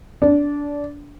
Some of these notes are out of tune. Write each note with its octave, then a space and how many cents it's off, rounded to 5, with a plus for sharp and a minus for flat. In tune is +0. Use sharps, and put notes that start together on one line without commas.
D4 -20